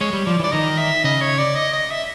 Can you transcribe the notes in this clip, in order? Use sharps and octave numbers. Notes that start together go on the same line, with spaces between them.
G#3 C#5
G3
F3 D5
E3
D5
D#3 D#5
E5
C#3 D#5
C#5
D5
D#5
D#5
E5